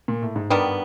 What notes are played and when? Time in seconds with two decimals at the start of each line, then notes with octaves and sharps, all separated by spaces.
0.08 A#2
0.22 A2
0.36 G#2
0.50 G2 D#3 G3 B3